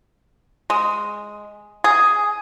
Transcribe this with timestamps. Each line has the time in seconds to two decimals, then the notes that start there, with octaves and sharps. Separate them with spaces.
0.70 G#3
1.84 G#4